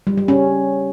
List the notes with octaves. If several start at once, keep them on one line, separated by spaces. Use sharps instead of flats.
G3
G3
C#4